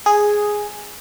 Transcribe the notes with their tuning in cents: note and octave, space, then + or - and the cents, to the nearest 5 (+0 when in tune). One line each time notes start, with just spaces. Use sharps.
G#4 +0